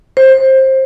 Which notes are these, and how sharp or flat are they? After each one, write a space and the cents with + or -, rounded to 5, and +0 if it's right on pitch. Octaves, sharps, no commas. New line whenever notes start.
C5 +20